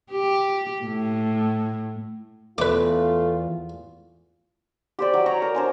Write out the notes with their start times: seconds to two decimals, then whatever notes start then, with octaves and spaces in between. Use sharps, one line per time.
0.11 G4
0.84 A2
2.58 E2 A3 F4 B4 D6
4.99 G4 C5 D5
5.14 F#3
5.26 C#5 A#5
5.42 A#4
5.55 D4 C5 G#5